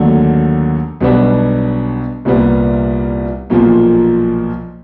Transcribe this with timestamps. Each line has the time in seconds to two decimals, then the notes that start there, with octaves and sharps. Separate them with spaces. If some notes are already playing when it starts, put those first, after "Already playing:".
Already playing: D#2 D3 F#3 A3
1.00 B1 B2 G3 B3 D4
2.25 C2 A#2 G3 B3
3.50 B1 A#2 F3